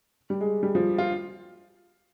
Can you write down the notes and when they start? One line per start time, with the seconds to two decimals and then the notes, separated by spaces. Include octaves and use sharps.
0.30 G3
0.41 G#3
0.63 G3
0.75 F3
0.98 F4